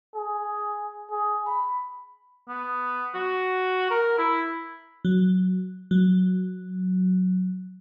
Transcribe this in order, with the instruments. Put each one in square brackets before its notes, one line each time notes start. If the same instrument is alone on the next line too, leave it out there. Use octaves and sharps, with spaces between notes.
[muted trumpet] G#4
G#4
B5
[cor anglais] B3
F#4
A#4
E4
[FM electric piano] F#3
F#3